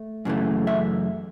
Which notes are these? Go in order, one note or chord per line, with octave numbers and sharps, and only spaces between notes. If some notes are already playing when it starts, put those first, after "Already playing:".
Already playing: A3
F#2 C#3 E3 A3
E5